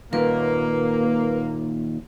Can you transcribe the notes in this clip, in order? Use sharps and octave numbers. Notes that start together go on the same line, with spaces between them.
D#2 A#2 A#3 A#4 B4